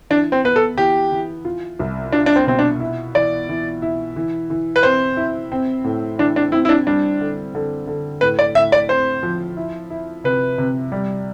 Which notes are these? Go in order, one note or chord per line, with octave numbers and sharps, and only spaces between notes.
E3 D4
C4
B3 B4
A4
E3 G4
E3
F4
C2
D4 F4
D4
C4
B2 C4
D4
E4
E3 D5
E3
E4
E3
E3
B4
C4 C5
E4
C4
A2
E3 D4
D4
C4 E4
E4
D4
G3 D4
D3
D3
D3
A2 B4
D5
A2 E5
D5
C4 C5
F3
E4
E4
C3 B4
C3
G3